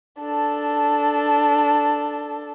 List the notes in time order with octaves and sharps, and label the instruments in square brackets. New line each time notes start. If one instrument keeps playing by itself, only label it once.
[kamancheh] D4 A4